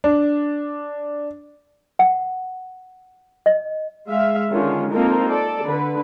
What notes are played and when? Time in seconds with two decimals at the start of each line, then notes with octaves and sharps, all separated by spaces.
0.04 D4
1.99 F#5
3.46 D#5
4.08 G#3 E5 F5
4.51 D3 D#3 G#3 C#4 F4
4.91 A#3 C4 D#4 F4 A4 A#4
5.28 A4 D5
5.64 D3 B4